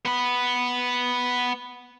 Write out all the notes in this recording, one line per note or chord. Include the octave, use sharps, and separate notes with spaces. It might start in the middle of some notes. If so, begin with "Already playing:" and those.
B3 B5